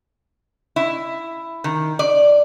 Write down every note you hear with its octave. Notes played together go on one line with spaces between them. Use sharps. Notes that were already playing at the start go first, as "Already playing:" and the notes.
E4
D#3
D5